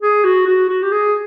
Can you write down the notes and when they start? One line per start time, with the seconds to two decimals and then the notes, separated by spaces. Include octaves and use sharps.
0.02 G#4
0.24 F#4
0.46 F#4
0.69 F#4
0.83 G4
0.92 G#4